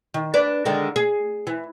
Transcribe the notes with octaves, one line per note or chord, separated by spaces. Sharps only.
D#3
D4 B4 D5
D3 D#3 G#3
G#4
E3